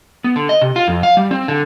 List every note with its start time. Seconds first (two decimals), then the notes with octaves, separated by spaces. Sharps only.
0.24 B3
0.36 D3
0.49 D#5
0.61 C3
0.76 F4
0.88 F2
1.03 F5
1.17 G3
1.31 C4
1.48 D3